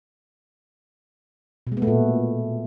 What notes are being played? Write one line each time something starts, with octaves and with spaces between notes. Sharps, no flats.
B2
G#3
B3
A3
A#2